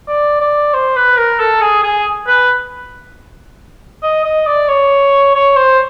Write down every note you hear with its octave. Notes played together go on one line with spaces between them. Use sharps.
D5
D5
C5
B4
A#4
A4
G#4
G#4
B4
D#5
D#5
D5
C#5
C#5
C5